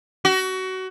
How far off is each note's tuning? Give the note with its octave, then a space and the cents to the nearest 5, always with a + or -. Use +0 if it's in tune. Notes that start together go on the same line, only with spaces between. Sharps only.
F#4 +25